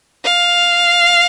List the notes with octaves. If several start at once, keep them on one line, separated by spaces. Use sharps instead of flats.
F5